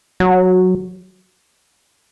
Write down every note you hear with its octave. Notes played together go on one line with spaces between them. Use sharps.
F#3